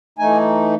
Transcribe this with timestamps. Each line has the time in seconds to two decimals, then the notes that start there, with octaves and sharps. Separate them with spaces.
0.18 E3 A3 D#4 G#5